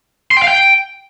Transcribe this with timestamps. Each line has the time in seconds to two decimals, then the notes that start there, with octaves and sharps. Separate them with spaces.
0.31 C6
0.37 G5
0.42 F5
0.48 G5